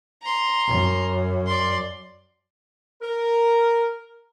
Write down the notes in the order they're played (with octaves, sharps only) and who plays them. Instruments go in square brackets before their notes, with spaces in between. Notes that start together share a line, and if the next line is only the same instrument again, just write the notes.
[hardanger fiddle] A#5 C6
[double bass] F#2
[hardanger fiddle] D5 C6
[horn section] A#4